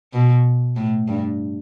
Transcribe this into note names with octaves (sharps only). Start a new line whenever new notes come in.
B2
A2
G2